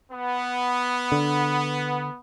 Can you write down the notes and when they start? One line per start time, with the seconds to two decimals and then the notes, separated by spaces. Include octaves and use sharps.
0.12 B3
1.12 D3